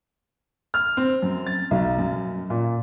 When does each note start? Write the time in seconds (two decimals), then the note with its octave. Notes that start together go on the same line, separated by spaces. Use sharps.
0.74 F6
0.97 C4
1.22 F#2
1.47 A6
1.71 B1
1.98 F#2
2.50 A#2